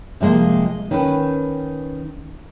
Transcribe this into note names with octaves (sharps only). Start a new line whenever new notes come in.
C3 F3 G#3 A#3
D#3 C#4 B4